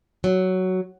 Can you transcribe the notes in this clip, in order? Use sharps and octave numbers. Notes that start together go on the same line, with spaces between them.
F#3